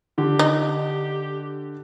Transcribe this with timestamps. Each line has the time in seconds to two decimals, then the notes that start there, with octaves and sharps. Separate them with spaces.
0.18 D3 G4
0.39 D#4